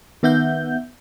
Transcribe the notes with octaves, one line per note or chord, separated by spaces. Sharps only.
D#3 B3 E5 F#5 G6